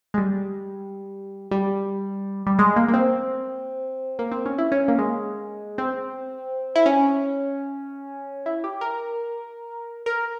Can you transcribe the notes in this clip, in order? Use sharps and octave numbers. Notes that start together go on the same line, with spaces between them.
G#3
G3
G3
G3
G#3
A#3
A#3
C4
A#3
C4
C#4
E4
C#4
A#3
G#3
C4
E4
C#4
E4
G4
A#4
A#4